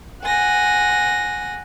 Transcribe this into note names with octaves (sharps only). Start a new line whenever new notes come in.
F#5 G#5 A#6